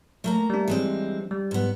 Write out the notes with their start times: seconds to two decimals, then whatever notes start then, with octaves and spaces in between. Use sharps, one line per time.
0.24 A3 A#3 A#5
0.50 G3 D4
0.68 E3 G#3 C4
1.31 G3
1.51 G#2 B3